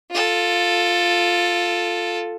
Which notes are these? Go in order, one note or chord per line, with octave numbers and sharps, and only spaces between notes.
F4 A4